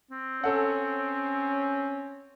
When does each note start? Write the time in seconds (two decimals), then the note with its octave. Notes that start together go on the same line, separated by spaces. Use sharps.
0.11 C4
0.44 C#4 A4 F#5